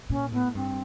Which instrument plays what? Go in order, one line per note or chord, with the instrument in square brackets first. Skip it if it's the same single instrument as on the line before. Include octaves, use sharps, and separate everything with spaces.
[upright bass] A#2 [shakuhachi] C#4
[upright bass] A2 [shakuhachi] B3
[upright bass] G2 [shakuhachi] C4